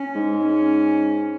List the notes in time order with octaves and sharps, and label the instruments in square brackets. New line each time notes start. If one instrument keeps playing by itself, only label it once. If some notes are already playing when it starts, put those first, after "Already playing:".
Already playing: [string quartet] C#4
[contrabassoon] G#2
[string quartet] C#4